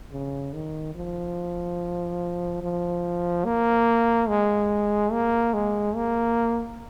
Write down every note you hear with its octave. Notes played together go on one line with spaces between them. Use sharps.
C#3
D#3
F3
F3
A#3
G#3
A#3
G#3
A#3